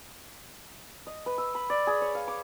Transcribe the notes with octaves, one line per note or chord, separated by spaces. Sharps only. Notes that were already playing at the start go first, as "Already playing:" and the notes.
D#5
B4
E6
B5
D5
G#4
C#5
F5
D6